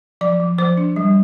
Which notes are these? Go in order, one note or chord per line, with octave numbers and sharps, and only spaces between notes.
F3 D5
F3
F3 C5
D4
G3